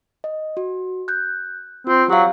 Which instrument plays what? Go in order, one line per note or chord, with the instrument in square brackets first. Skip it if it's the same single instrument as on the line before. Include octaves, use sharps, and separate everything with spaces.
[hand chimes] D#5
F#4
F#6 G6
[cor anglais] C4 [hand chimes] F4
[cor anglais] F#3 [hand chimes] G4 F5